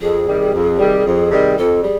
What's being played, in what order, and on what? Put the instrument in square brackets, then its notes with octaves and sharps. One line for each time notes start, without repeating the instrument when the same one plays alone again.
[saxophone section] F2 [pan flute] G#4
[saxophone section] C3 D#3 G3
F2
C3 D#3 G3
F2
C3 D#3 G3
[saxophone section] F2 [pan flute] A4
[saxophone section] G3 [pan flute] G#4